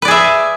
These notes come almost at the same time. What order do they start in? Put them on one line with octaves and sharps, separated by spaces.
B4 D5 G#4 E5